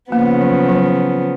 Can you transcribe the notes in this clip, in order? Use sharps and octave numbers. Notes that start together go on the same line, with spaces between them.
C#3 F3 A#3 B3
F#3
F#3